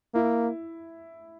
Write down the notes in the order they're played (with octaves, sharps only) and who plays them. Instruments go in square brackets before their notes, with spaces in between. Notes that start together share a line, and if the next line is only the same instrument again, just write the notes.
[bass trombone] A#3 [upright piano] E4